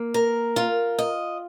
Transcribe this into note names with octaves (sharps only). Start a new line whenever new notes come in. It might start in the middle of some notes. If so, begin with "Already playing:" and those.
Already playing: A#3
A#4
F4
D#5